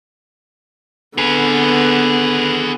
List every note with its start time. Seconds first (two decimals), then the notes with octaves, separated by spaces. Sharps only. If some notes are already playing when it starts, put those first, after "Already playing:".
1.18 D3 B3 G#4 B4